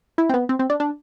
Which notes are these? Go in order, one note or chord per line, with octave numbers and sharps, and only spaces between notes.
E4
C4
B3
C4
C4
D4
D4